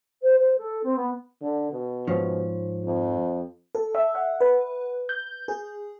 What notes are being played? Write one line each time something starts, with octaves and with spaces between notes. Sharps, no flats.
C5
C5
A4
C4
B3
D3
B2
G#2 F3 C#4
F2
A4
E5
F#5
B4
G6
G#4